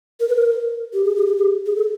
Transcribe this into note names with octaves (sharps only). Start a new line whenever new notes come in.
A#4
B4
A#4
G4
G#4
G4
G#4
G4
G#4
A4